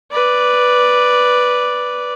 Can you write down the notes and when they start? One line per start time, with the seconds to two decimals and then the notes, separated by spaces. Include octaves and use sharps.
0.12 B4 D5